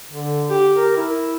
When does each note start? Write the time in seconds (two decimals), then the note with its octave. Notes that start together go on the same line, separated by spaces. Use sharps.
0.10 D3
0.50 G4
0.77 A#4
0.97 E4